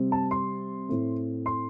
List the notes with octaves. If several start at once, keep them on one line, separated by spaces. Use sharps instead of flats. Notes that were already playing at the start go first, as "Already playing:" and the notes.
Already playing: C3 G3 C4
A5
C6
A2 A3 C4
C6